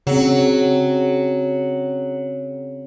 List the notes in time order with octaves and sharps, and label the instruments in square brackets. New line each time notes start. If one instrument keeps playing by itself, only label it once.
[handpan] C#3 C4 [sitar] F#3